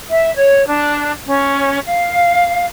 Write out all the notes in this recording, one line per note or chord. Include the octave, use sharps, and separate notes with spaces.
E5
C#5
D4
C#4
F5